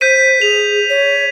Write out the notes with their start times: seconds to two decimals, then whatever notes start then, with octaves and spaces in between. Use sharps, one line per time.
0.01 C5 G6 B6 D#7
0.42 G#4 F7
0.90 C#5